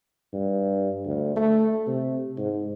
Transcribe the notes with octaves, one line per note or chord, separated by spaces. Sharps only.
G2
D2
A3
C3
G#2